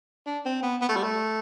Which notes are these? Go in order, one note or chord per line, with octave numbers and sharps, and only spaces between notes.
D4
C4
B3
B3
A3
G3
A3